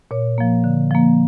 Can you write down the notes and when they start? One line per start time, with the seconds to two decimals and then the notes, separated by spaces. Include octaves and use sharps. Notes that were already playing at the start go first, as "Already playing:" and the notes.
0.11 A#2 C#5
0.38 F3 A#3
0.64 D3
0.91 F3 A#3